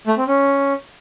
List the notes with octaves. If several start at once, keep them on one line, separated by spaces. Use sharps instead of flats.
A3
C4
C#4